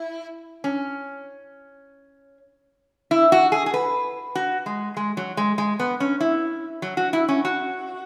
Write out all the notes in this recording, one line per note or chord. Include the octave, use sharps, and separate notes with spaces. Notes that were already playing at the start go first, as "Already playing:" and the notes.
Already playing: E4
C#4
E4
F#4
G#4
G#4
B4
F#4
G#3
G#3
F#3
G#3
G#3
B3
C#4
E4
F#3
F#4
E4
C#4
F#4